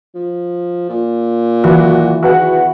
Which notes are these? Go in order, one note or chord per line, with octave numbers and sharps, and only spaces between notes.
F3
A#2
E3 F#4
E2 F#4 B4 F#5